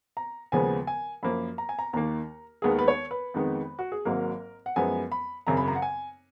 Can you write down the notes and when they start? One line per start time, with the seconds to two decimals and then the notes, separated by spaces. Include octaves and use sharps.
0.17 A#5
0.52 D#2 C#3 F3 G#3 B3 G#5
0.87 G#5
1.23 F#2 F3 A#3 B5
1.58 A#5
1.69 G#5
1.79 A#5
1.93 D#2 D#3 A#3 A#5
2.62 D#2 D#3 G#3 B3 G#4
2.71 A#4
2.79 B4
2.88 C#5
3.11 B4
3.34 F2 D#3 G#3 B3
3.79 F#4
3.92 G#4
4.05 G#1 G#2 F#3 A#3 A#4
4.66 F#5
4.76 F#2 F3 G#3 B3 G#5
5.12 B5
5.47 G#1 F#2 C#3 A#5
5.57 B5
5.68 A#5
5.76 F#5
5.82 G#5